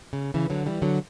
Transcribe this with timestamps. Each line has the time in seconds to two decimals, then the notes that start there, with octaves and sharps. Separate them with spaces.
0.13 C#3
0.34 C#3 E3
0.50 D3 F#3
0.66 E3 G3
0.82 D3 F#3